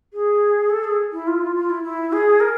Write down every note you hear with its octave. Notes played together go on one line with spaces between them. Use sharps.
G#4
A4
G#4
E4
F4
E4
F4
F4
E4
E4
G#4
A#4